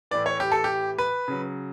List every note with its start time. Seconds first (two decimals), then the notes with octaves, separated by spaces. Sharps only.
0.11 A2 E3 D5
0.26 C#5
0.40 G4
0.52 A4
0.64 G4
0.98 B4
1.28 C#3 F#3